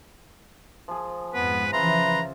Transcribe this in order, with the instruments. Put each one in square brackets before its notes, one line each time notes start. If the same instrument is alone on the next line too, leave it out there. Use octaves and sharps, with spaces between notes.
[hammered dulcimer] F3 G#4
[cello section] F2 G#2 [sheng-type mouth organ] B3 [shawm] B4
[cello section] C#3 E3 F3 [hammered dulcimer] F4 E5 [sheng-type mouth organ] B4 C6 [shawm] A#5